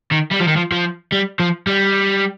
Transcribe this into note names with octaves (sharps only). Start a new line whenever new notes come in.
D#3
G3
F3
D#3
F3
F3
G3
F3
G3